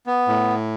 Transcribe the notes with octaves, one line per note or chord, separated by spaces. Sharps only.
B3
A2